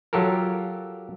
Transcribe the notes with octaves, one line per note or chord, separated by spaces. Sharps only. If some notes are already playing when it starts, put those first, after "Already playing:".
F#3 F4 G4 A4 A#4